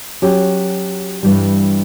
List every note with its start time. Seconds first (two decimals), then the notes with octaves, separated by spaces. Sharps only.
0.22 F#3 C#4 G4
1.23 G2 E3 G3